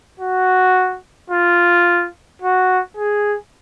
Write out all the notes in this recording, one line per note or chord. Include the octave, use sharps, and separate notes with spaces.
F#4
F4
F#4
G#4